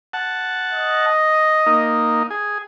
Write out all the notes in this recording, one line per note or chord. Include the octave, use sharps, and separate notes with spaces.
F#5 A5
D#5
A#3 D#4
G#4